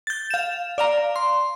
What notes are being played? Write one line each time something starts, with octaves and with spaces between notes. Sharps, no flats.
G6 A6
F5 E7
D5 F5 A#5
C6